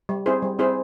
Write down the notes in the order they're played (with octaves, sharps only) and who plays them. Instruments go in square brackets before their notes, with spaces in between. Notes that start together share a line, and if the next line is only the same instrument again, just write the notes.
[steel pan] G3
C4 E4 G#4 C5
G3
C4 E4 G#4 C5